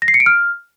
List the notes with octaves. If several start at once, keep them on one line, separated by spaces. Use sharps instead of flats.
A#6
C7
C#7
D7
F6